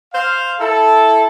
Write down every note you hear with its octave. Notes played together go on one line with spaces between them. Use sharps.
C5 F5
E4 A4